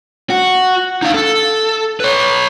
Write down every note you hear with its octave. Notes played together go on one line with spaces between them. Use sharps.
F#4
D#4 F5
A4
B4 C#5